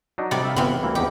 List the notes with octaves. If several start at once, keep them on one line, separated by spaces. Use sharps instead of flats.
F#3 D4 D#4
C3 G3 D5
E5 F5
G1 E3 B3 C4 F5
D2 E3 A#3
E2 F#3 G4 D#5